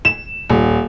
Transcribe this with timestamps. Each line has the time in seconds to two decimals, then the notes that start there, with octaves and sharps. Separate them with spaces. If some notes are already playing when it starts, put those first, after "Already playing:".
0.05 E7
0.50 D#1